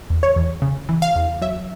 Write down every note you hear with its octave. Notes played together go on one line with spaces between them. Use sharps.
E2
C#5
E2
C#3
E3
F5
E2
F#3 E5